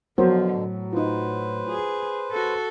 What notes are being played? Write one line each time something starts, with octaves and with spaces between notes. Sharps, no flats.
B2 D3 F3 F#3 B3 A#4 C5
A2
D#4 F4 B4 C5
F4 G#4
F#4 A4